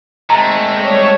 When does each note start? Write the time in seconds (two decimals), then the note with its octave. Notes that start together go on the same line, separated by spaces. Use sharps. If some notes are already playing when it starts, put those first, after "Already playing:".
0.30 G#3 A3 C4 A#5
0.79 G3 C#5